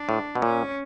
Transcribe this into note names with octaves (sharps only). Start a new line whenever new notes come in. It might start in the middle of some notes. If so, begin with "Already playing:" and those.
Already playing: D4
A2
B2
A#2 C#4